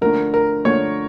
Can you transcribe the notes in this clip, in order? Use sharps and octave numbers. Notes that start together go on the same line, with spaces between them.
D3 F3 A3 A#4
A#4
D3 F3 A3 C#5